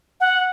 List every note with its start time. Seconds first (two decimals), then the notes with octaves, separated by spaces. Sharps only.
0.20 F#5